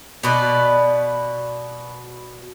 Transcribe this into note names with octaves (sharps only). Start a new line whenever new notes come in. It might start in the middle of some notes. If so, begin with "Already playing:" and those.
B2 B4 D5